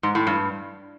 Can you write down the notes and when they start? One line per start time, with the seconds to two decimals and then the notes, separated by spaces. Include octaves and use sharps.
0.03 G#2
0.15 A2
0.27 G2